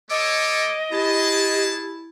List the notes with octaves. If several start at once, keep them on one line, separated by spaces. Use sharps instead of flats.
A3 A4 C#5 D#5 D6
B3 E4 G4 G#4 A5